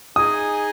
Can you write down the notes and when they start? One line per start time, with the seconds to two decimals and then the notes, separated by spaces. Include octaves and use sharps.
0.16 D#4 G#4 D#5 G#5 D#6